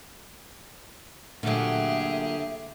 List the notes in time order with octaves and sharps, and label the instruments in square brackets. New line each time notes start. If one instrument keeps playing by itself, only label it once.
[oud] A#2 F#3 [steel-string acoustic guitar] D3 A3 [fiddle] G4 G#4 [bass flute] E5